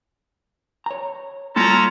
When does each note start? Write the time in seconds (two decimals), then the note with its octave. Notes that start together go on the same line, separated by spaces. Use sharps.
0.86 C#5 A#5
1.56 G3 A#3 C#4 D#4 F4 A4 A#5 C6